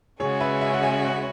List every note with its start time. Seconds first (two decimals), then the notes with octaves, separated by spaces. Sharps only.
0.20 C#3 G#3 C#4 F#4 G#4 C#5
0.40 B4 E5
0.61 E5 G#5
0.74 F#5
0.82 E5 G#5
1.03 C#5 F#5